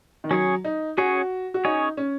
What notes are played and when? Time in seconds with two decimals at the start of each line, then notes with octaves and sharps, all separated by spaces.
0.24 D#3
0.31 F#3 C#4 G#4 C#5
0.65 D#4
0.97 C#4 F#4 G#4 C#5
1.54 F#4
1.65 C#4 D#4 G#4 C#5
1.97 C#4